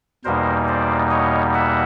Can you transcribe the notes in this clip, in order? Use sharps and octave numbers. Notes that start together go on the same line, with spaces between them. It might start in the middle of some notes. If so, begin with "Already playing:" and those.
E2 B2 G3 A#3 D#4 A#4 C5
C5 D5
C#5 D#5
E5 F#5